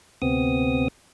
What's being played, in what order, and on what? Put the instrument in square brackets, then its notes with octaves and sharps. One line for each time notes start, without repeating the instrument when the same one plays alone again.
[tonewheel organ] D2 C3 B3 C4 D#6